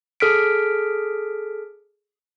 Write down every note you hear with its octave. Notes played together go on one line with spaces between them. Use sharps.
G#4 A4 F6 B6 D7